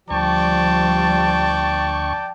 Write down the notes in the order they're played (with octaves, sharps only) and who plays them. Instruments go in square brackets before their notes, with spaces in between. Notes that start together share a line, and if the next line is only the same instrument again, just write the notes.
[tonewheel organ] D2 C#6 [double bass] F3 G3 [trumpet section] D5 G5 A5